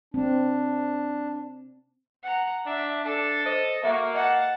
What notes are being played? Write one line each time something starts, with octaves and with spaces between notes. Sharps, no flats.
C4 D4
F#5 A#5
D4 E5
D4 A4 A5
C5 D#5
A#3 F#4 E5
D#5 F#5 A5